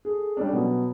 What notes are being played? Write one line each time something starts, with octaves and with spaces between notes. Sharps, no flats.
G#4 A4
G3 A3 C#4 D4
B2 F#3 B3